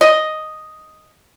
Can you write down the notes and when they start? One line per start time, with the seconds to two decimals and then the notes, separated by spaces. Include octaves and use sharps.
0.01 D#5